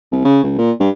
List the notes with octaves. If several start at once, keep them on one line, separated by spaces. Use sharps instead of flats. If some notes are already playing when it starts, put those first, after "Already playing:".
C2
C#3
C#2
A#2
G2